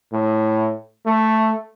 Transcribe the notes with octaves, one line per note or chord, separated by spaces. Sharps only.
A2
A3